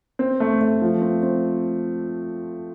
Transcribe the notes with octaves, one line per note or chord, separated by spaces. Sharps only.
C4
A3
A3
F3
C4
C4